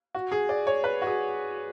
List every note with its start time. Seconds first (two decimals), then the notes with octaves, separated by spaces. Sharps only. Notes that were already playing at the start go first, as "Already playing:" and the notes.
0.15 F#4
0.32 G#4
0.49 D5
0.67 C#5
0.84 B4
1.02 F#4
1.07 G#4